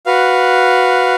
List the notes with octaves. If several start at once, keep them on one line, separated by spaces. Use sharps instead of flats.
F#4 B4 F5